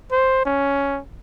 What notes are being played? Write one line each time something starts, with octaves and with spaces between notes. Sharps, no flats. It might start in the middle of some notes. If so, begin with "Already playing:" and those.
C5
C#4